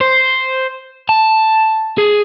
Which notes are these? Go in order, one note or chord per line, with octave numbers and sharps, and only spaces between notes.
C5
A5
G#4